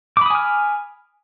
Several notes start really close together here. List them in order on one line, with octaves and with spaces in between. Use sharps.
D6 B5 D#6 G#5 F6